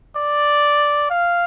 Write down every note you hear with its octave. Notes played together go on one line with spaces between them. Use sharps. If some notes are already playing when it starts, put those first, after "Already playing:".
D5
F5